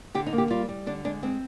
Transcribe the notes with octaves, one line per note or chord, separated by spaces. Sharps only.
D3 G4
D#4
A#3
G4
G3 F4
G3
D3 D4
G#3 D4
G#3 C4